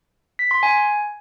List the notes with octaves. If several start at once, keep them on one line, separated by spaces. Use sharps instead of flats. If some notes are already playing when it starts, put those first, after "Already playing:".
B6
C6
G#5